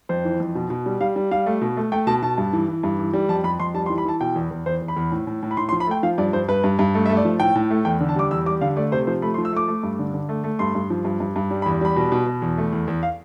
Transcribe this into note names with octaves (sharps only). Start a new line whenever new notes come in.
F2 C5
E3
F2
B2
B2
G3
G3 F5
G3
G3 F5
A3
B2
A3
A3 G5
B2 A5
B2 A5
G2
E3
E3
G2
E3
G3
F2 A5
F2 B5
F2 C6
G3 A5
C6
E3
B5
E3 A5
B2 G5
E2
E2
E2 C5
E2
B5
E2
A2
A2
A2
B5
A2 C6
C6
F3
B5
A3 G5
F3 F5
G2 D5
G2 C5
G2 B4
G2
G2
A3
E5
A3
D5
F3
A2 G5
A2
A3
E2 G5
D3
A5
G3 D6
E2 E6
G3 D6
D3 F5
A3 D5
C3 C5
F3 C5
A3 B5
C6
F3
E6
A3 D6
A3
G2
D3
D3
A3
A3
G2 C6
G2
F3
G2
G2
G2
G3
B5
E2
G3 B5
B2
B2
B2
E2
A3
E2
E2
F5